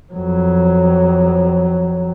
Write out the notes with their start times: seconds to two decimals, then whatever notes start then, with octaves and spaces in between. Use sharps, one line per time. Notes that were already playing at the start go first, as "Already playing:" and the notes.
0.13 F2 F#3